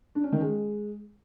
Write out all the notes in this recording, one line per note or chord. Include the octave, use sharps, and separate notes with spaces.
D4
C#4
D#3
G#3